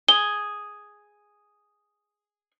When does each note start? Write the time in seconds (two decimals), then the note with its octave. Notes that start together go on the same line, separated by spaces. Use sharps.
0.08 G#4 G7